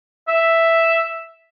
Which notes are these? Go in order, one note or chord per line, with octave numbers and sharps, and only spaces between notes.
E5